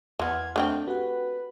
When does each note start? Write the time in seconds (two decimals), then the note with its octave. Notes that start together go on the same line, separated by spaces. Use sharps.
0.19 E2 E3 B3 C6 F6 G#6
0.56 A3 C4 D4 G5
0.88 F#4 G4 B4 F#5